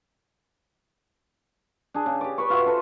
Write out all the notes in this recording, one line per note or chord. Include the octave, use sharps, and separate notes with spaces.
D4 G#4
C#3
G4 D5
B4 B5 C#6
F4 F#4 E5
A4 B4 C5 B5